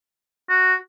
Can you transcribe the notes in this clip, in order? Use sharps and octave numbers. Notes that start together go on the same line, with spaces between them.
F#4